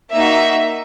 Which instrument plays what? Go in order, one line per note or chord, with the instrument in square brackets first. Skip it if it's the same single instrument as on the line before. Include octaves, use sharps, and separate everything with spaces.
[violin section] A#3 D#4 F#4 E5